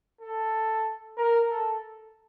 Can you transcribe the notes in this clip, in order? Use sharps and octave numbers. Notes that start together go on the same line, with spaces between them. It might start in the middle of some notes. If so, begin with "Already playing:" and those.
A4
A#4
A4